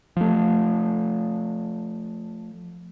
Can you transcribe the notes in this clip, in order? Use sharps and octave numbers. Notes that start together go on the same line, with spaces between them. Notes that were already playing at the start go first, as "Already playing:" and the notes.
F3 A3